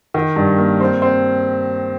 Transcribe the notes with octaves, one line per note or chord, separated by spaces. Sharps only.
D#3
G2
A#3
C4
C4